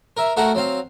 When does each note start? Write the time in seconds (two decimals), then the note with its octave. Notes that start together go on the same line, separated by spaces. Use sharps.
0.17 A#4 E5
0.37 A3 F#4 A4 A#4 F#5
0.55 F#3 C4 F5